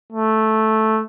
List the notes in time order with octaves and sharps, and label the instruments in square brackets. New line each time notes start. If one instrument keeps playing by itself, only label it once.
[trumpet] A3